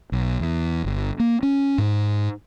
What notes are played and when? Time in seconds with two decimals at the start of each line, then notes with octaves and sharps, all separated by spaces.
0.12 B1
0.40 E2
0.84 G1
1.20 A#3
1.43 C#4
1.78 G#2